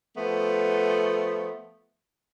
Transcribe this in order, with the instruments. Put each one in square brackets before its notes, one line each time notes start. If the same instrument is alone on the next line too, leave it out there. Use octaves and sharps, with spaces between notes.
[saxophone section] F3 A3 B3